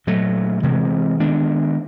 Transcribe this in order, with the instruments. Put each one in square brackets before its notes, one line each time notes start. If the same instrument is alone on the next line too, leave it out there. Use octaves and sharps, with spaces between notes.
[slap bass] A#2 F#3 A3
C3 E3 G#3 C4
D#3 G#3 B3 D4